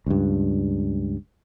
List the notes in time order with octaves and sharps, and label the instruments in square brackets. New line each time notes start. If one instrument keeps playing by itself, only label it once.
[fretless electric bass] C#2 G2